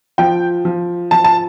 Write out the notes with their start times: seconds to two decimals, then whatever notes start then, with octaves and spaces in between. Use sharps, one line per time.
0.18 F3 G5
0.65 F3
1.11 F3 A5
1.24 A5